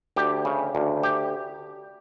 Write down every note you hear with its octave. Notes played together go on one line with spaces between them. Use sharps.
D2 G4
C#3
D2
G4